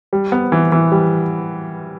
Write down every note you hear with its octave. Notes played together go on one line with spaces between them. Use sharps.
G3
B3
E3
E3
G3